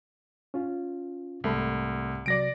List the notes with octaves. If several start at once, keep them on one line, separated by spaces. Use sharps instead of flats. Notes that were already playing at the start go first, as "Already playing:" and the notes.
C#4 F4
C2 G#2 A3 B5
C3 F#3 D5 A#6 D7